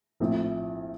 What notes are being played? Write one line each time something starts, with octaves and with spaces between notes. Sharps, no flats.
A#1 A2 F3 A3 C4